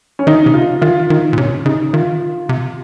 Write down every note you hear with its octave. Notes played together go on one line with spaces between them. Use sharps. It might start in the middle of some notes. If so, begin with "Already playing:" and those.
C#4
D#3 D#4
C3
C#3 F4
D#3 F4
D#3 D#4
A#2
C3 C#4
C#3 D#4
D#3 F4
C3